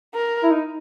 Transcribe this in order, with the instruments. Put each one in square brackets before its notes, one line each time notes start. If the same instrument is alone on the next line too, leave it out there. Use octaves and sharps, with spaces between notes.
[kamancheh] A#4
[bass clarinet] E4
D#4